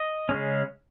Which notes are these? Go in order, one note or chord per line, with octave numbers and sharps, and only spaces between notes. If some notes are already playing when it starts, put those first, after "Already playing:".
Already playing: D#5
C#3 G#3 C#4